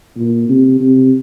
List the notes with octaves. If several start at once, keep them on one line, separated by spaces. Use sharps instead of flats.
A#2
C3
C3